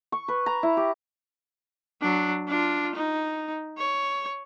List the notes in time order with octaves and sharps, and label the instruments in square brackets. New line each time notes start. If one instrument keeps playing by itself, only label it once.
[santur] C#6
B4
A#5
E4
G4
[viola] F#3 D4
D4 F4
D#4
C#5